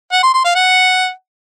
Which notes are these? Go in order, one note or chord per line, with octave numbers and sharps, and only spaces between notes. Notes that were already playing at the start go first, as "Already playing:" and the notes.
F#5
C6
C6
F5
F#5